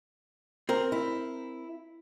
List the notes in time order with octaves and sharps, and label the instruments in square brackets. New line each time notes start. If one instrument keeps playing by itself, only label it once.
[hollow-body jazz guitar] C4 A#4
[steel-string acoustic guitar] E4